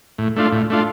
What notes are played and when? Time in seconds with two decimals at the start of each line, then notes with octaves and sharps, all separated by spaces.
0.18 A2
0.36 A3 D4 F4
0.52 A2
0.70 A3 D4 F4